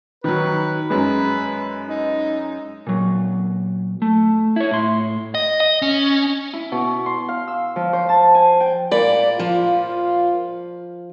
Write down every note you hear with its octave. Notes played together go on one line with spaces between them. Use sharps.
D#3 F#3 B4
F#2 G#3 B4
D#4
A#2 F#3
A3
E4 C#5
A2 C6
D#5
D#5
C#4
E4
B2
C6
F5
E6
F3
C5
A5
G#5
G5
A#2 D5 B5
F3 F4